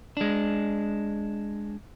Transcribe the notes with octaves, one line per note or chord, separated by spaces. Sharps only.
G#3 D4